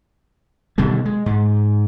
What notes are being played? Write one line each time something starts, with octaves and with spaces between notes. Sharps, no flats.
B2 D3 D#3 G3
G#3
G#2